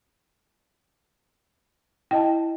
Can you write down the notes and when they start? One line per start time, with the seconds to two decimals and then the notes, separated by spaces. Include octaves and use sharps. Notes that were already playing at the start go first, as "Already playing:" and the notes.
2.11 E4 D#5 G5 A5